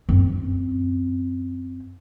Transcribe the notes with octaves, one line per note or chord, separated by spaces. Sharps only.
F#2 C4